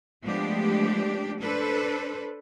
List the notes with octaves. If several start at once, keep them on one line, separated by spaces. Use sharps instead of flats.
F3 G#3 A3 B3 D4 G4
D4 A4 B4 C5